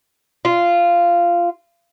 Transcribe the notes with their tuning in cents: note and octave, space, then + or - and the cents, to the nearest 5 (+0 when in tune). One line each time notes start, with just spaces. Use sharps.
F4 -10